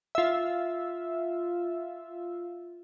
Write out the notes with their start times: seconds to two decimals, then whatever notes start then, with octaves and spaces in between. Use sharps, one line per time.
0.15 F4 E5